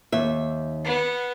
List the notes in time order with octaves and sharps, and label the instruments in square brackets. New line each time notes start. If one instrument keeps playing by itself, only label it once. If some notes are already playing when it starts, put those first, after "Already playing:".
[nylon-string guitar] D#2 E5
[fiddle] B3